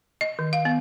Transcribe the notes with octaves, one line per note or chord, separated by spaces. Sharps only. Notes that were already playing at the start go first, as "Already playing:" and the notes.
D#5
D#3
F5
B3